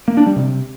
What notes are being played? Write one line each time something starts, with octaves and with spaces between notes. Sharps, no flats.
A#3
D4
G3
C3